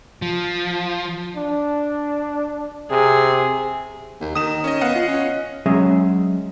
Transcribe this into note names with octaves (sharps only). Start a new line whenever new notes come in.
F3
D4
C3 G#4
D#2
D#3 D#6 E7
C#4 D#5
B3 D#5 F5 F#5
F4
C#4
F#3 G#3 C#4 G#4 D#5 E5